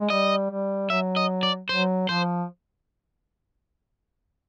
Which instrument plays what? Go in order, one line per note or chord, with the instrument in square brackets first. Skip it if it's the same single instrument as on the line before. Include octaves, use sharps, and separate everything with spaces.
[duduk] G#3
[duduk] G3 [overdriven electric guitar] D#5
[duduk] G3
[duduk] F#3 [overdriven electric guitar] E5
[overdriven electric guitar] D#5
D5
[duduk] F#3 [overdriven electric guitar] C5
[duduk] F3 [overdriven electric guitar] C5